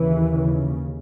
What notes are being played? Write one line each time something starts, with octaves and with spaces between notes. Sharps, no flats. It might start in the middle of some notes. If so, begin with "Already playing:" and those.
Already playing: D#2 C#3 E3
C#3